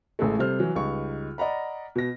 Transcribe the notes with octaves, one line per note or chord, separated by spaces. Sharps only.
A1 G#3 A3
C3 G3 A4 C5 F6
E3 F#3
C#2 G3 D#4 C#6
D5 D#5 F#5 A#5 B5
B2 A#6